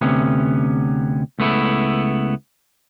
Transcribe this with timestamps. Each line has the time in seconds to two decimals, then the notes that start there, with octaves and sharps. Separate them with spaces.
0.01 D2 C3 B3 C#4
1.39 C#2 A3 B3 E4